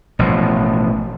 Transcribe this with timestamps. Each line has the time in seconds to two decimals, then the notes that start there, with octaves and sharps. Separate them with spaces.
0.19 A1 B2 F3